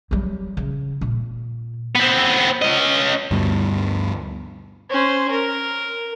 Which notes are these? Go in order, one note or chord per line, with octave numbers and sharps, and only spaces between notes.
F#3 G3
C#3
A#2
B3 C4
C#4 D#5
D2 G2 B2
C#4 C5
A#4